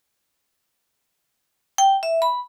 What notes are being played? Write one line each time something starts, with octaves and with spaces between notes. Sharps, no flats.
G5
E5
B5